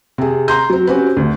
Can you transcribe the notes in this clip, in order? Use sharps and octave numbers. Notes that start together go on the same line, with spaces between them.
C3 G#4
A#5 C6 G6
F#3 C4
C4 C#4 F#4 G4 B4
D2